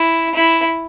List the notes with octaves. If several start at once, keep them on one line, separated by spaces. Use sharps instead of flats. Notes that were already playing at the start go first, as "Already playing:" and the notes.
Already playing: E4
E4